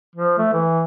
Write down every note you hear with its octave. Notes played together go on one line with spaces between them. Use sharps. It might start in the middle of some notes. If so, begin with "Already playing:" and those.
F3
A3
E3